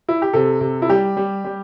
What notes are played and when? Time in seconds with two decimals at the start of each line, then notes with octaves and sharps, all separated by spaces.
0.09 E4
0.22 G4
0.33 C3 A4
0.61 C3
0.82 E4
0.89 G3 G4
1.17 G3
1.44 G3